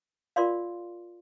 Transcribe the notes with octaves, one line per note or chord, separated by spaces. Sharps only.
F4 A#4 D5 F5 C6